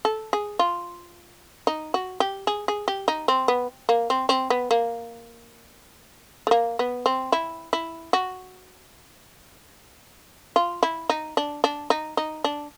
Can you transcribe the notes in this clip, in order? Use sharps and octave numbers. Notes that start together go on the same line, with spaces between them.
A4
G#4
F4
D#4
F#4
G4
G#4
G#4
G4
D#4
C4
B3
A#3
C4
C4
B3
A#3
A3
A#3
B3
C4
E4
E4
F#4
F4
E4
D#4
D4
D4
D#4
D#4
D4